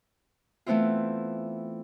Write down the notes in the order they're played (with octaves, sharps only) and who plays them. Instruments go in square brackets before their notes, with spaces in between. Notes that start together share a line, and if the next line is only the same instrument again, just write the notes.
[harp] E3 A3 B3 C4 E4 F4